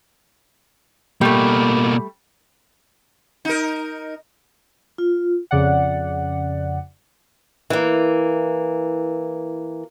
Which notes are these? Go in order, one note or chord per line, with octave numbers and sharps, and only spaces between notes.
B2 G3 A3 A#3
D#4 A#4
F4
F2 C#3 D5 F#5
E3 A#3